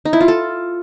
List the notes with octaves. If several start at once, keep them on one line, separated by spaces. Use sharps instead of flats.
D#4
E4
F4
A4